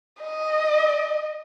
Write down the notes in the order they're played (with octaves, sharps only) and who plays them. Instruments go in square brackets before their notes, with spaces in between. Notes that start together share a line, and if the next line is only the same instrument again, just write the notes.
[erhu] D#5